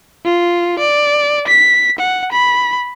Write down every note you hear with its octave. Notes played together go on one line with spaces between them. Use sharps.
F4
D5
B6
F#5
B5